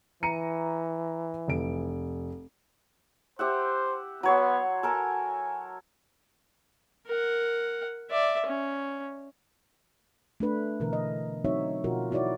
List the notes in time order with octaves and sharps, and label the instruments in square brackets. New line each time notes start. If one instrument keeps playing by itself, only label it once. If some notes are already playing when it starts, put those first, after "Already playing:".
[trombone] E3 [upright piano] A#5 C#7 D#7
[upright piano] F1 D7
[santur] G4 E5 F#5 [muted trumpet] C5
[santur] F#3 C#5 C6 [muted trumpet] B3
[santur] A4 A#4 A5 [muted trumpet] G#5
[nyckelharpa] A#4 F#5
D5 E5
C#4
[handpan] A3 D4 B4
B2 D3 E3 A#4
D#5
F#3 C4 D#4 F#4 C#5 E5
B2 F3 F4 F#4 A#4
D#4 E4 F#4 C#5 D5